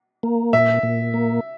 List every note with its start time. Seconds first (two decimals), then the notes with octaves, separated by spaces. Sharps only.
0.23 A#3
0.53 A#2 E5
0.83 A#2
1.14 A#3